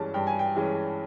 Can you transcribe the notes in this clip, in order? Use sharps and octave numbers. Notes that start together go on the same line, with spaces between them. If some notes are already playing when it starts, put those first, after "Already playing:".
Already playing: G2 E3 G#3 C#4 A5
G2 G5
G#5
G5
E3 G#3 C#4